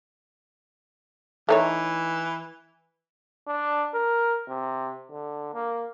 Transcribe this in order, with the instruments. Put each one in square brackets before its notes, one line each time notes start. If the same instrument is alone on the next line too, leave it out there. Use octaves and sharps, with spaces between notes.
[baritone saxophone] E3 [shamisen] A3 D#4 C#5
[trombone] D4
A#4
C3
D3
A#3